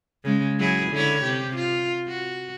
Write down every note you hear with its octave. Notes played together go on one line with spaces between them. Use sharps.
C#3 G#3
F#3 E4 G#4
D3 E4 C#5
C3 G4
F4
F#4